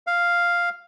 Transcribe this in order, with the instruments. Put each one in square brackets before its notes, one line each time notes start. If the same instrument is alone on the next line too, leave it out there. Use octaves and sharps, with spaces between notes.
[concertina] F5